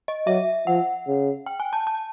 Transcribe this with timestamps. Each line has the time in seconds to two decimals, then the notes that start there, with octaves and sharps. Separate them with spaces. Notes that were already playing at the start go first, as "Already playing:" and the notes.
0.08 D#5
0.27 F#3 E5
0.67 F3 F#5
1.07 C#3
1.46 G5
1.60 G#5
1.73 A5
1.87 A5